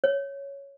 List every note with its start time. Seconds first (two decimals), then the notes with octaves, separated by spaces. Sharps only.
0.04 C#5